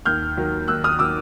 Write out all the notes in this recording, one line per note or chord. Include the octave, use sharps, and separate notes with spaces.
D#2 F6 G6
D#3 F#3
D#2 E6 F#6
D#6 F6
D#3 F#3 D6 E6